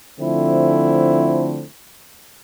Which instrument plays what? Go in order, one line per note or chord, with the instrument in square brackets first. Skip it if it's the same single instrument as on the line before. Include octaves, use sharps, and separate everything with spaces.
[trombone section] D3 F3 A3 C4 E4